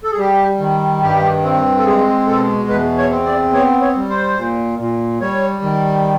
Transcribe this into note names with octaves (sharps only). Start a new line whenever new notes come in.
A4
G#4
G3 G4
D#3
G2 G4
C4
A4
G#3 G#4
B2 A4
E2 B4
C#5
C4
D5
B3 C#5
C#5
G3
C5
A#2
A#2
G3 C#5
D#3